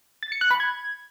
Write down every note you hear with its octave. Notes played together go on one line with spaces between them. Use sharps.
A6
C#7
F#6
B5
G#6